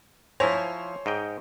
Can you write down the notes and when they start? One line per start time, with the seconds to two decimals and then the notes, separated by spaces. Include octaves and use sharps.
0.40 F3 E4 C5 C#5 G#5 A#5
1.06 G#2 D#5 G5